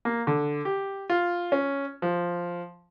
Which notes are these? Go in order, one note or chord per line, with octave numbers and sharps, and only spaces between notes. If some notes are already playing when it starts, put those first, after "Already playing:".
A#3
D3
G4
F4
C#4
F3